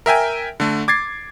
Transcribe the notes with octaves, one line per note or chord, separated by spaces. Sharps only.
A#4 E5 G5 G#5
D3 A3
D6 G#6 A6 C7